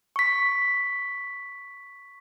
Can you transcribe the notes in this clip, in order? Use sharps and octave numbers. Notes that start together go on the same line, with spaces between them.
C#6 B6